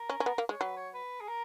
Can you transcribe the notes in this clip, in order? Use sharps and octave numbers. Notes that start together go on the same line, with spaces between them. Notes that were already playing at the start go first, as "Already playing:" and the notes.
Already playing: A#4
C#4
C#4
B3
A#3
G#3
C#5
F#3 B4
C#5
B4
G#4
A#4